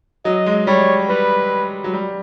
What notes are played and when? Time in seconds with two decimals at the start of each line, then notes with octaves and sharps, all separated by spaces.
0.25 F#3 D#5
0.46 G#3
0.67 G3 C#5
1.09 G3 B4
1.84 F#3
1.93 G3